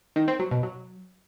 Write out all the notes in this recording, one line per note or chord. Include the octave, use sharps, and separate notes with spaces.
D#3
C4
F#3
B2
F#3